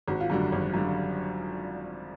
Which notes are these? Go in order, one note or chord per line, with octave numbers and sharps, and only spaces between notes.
G#1 F#4
F4
F#2 D3 G3 F#4
G#1
F#2 D3 G3